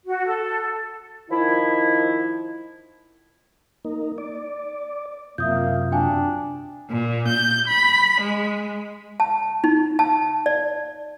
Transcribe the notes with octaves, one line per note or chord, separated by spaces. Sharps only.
F#4
A4
D#3 F3 E4
A#3 D#4
D5
F#2 C3 A#3 F4 E5 D#6 G6
D4 F#4 G5 G#5
A#2
G6
B5
G#3
A5
D#4
A5
D5